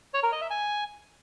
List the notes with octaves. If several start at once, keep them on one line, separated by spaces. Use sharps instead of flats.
C#5
A#4
D#5
E5
G#5